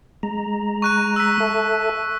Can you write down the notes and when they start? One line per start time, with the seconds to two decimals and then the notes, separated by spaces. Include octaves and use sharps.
0.23 G#3 A#5
0.82 C#6 F#6 D#7
1.16 E6 B6
1.40 A4 E5 A5